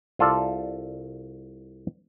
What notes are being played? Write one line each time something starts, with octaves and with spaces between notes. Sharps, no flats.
C2 F4 A4 D5